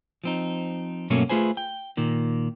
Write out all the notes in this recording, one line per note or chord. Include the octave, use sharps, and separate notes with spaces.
F3 C4 D#4
G2 B2 F#3 A3 A#3 C#4
A3 F4 G#4 B4 C5 G#5
G5
A#2 D#3